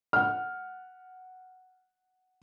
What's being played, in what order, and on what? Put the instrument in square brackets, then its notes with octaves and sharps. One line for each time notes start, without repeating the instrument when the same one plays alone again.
[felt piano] F#5 F6